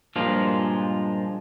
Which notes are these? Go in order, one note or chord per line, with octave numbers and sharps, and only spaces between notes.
G2 A#2 F3 G#3 F4